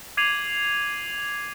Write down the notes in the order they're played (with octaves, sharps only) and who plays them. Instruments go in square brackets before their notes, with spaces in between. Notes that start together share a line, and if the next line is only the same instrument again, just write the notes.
[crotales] D6 G#6 C7 D#7 F7 F#7